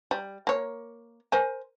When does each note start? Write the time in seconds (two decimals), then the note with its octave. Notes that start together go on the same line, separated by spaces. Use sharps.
0.11 G3
0.47 A#3 C#5
1.32 A#4 C5 G#5